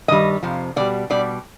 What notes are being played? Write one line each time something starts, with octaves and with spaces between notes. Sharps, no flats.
G2 D#3 G3 D#5
F2 C3 F3
B2 G3 D5
B2 G3 D5